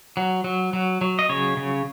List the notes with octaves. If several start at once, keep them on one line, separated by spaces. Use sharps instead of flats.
F#3
F#3
F#3
F#3
D#5
C#3 C#5
C#3